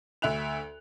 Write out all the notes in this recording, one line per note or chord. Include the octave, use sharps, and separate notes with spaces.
D2 E5 F#6 F7